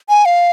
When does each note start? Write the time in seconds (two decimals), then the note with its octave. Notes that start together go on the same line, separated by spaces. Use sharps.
0.09 G#5
0.25 F5